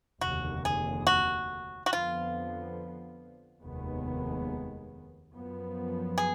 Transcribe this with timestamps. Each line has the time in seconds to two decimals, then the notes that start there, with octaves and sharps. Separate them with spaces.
0.21 F1 D#2 D3 F#4
0.65 G#4
1.07 F#4
1.86 F#4
1.92 F2 D3 F3 B3 F4
3.62 F1 D#2 D#3 G#3 B3
5.33 F#2 F3 B3
6.18 G#4